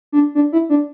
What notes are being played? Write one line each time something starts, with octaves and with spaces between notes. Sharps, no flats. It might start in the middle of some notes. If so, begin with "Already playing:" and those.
D4
D4
E4
D4